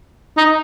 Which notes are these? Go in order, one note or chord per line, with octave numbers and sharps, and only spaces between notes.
D#4